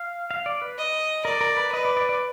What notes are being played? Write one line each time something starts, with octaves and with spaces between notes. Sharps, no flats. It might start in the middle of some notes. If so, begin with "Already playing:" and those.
Already playing: F5
F5
D5
B4
D#5
A#4 D5
A#4
B4
B4 D#5
D5
D5
D5